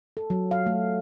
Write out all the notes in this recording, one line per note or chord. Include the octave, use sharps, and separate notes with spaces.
A4
F#3
F5
A3